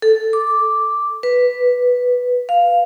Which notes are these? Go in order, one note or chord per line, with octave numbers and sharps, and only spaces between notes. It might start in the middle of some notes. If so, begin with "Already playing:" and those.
A4
D6
B4
F5